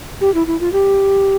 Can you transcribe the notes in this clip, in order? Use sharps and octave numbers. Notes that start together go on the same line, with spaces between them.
G4
E4
E4
F4
G4